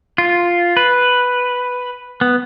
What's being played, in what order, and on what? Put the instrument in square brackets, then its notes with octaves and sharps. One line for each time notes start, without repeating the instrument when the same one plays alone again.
[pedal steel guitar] F4
B4
B3